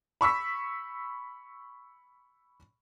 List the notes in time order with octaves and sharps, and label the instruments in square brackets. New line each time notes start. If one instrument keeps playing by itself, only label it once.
[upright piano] B5 C#6 E6 B6